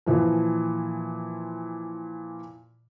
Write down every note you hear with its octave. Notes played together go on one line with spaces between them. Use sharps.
A#2 E3 F3